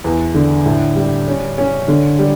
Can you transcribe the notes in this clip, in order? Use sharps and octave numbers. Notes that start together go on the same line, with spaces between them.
E2
D3
A2
G3
C#4
C#4
D3
G3